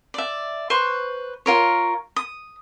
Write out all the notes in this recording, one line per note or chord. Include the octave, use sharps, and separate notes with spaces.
D5 E5
B4 C5 C#6
F4 A#4 C#5
D#6